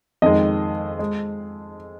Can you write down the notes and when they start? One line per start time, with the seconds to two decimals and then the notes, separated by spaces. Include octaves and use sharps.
0.22 F2 D#3 G#3 D#5
0.99 G#3